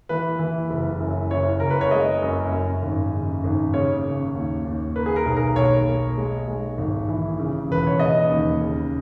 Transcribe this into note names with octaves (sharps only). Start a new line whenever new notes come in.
E3 B4
E3
F#1
F#2
F#1 C#5
F#1 A#4
B4
C#5
G#3 D#5
F#2
F#2
G#1
C#3
G#1
C#3 C#5
C#3
D#2
D#2
A#3 B4
G#4
A#4
B1
A#4
B1 C#5
A#3
G#3
G#3
G#1
E3
C#3
E1 B4
C#5
C#3 D#5
D#2
C#3